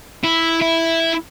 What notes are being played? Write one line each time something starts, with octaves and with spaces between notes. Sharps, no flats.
E4
E4